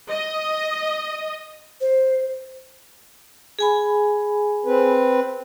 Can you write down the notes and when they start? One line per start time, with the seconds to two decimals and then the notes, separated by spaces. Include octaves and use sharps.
0.11 D#5
1.81 C5
3.59 G#4 G#5 B5
4.66 C4 B4